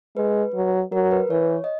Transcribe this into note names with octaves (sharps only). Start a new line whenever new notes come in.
G#3 B4
F#3
F#3 A#4
B4
E3 C#5
D#5